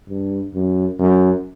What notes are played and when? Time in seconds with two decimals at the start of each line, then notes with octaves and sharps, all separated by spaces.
0.09 G2
0.54 F#2
0.99 F#2